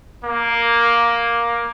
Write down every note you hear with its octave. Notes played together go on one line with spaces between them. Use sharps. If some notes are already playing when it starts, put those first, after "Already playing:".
A#3